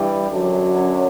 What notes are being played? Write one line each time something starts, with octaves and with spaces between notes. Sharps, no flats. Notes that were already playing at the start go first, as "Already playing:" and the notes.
Already playing: G2 E3 G3
F#2 D3 F#3
C#4